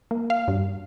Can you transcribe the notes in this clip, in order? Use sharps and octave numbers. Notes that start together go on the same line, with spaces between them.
A#3
F5
G2